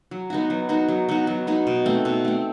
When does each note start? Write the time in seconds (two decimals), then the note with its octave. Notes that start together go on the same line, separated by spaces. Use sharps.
0.11 F#3
0.30 B3 D#4 F#4
0.50 F#3
0.69 B3 D#4 F#4
0.88 F#3
1.09 B3 D#4 F#4
1.27 F#3
1.47 B3 D#4 F#4
1.67 B2
1.86 A3 C4
2.05 B2
2.25 A3 C4